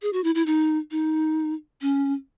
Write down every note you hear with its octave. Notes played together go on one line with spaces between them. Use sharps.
G#4
F#4
E4
E4
D#4
D#4
C#4